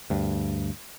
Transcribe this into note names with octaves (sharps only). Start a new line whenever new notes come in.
D2 G2